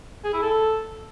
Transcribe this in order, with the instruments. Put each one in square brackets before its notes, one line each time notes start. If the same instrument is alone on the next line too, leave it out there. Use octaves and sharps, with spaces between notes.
[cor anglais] G#4
E4
A4